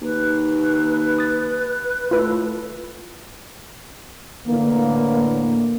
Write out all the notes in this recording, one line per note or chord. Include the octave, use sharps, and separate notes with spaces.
D#2 B4
D#6 A6
A2 F4 A4 B4
A2 D3 E3 A#3